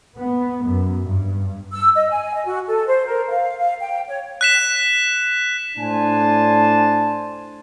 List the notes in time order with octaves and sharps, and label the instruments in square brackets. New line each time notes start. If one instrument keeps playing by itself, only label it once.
[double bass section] B3
F#2
G2
[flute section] E6
D#5
G#5
D#5
F#4
A4
C5
A#4
F5
F5
G5
C#5
[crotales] F#6 B6 E7
[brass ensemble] A2 D4 C5 G#5 A5